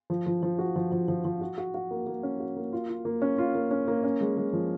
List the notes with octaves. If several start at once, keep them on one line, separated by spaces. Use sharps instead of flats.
F3
F3
F3
F#4
F3
F3
F3
F3
F#4
F#4
F#4
A#3
A#3
C#4
F#4
A#3
F4
F4
A#3
C#4
F4
A#3
C#4
A#3
C#4
G#3
G#3
F3